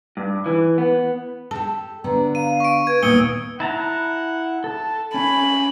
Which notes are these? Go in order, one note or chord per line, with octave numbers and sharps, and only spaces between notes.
G2
E3
B3
G4 A4 A5
D3 B3 A#5
F5 D#7
C#6 D7
B4 G#6
D#2 A#2 A#3 B3 D#6 E6 C#7 G7
E4 F#5 A5 A#5
A4 A5
C#4 G#5 B5